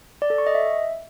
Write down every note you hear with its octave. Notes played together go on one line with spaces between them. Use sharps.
D5
A4
C#6
D#5
E5